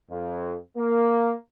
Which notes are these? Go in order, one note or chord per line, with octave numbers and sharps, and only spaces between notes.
F2
A#3